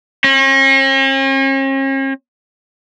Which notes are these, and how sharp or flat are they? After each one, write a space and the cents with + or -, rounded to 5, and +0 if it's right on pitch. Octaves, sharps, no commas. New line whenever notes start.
C#4 -45